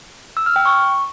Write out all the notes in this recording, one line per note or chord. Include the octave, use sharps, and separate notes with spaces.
E6
F6
G5
C#6